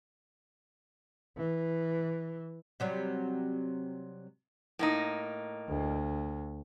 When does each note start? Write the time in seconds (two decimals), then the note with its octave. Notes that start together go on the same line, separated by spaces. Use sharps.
1.37 E3
2.80 C3 F#3 G3
4.79 A2 A#3 D#4
5.69 D2